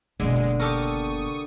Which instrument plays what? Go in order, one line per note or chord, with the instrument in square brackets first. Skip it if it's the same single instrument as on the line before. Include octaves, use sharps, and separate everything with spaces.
[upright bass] F#1 B2 [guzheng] D3 [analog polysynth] G#3
[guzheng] G4 A4 A#4 [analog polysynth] C#6 D#6